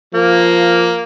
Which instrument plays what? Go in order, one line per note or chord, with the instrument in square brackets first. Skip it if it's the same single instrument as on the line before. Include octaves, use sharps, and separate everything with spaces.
[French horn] F3 [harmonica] A#3